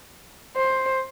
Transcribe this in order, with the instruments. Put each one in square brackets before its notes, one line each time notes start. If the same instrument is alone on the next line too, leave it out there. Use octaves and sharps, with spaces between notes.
[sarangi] C5